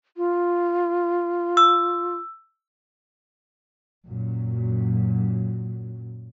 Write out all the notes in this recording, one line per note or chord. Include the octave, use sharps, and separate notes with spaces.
F4
E6
F#2 A#2 F#3